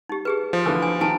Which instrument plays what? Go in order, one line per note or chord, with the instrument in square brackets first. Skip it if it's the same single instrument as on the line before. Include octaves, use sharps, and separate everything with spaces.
[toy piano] D#4 G4
G4 G#4 B4
[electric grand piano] F3
[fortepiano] D3 E3 [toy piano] G4
[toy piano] G#5
[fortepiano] D#3 [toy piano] G#5 A5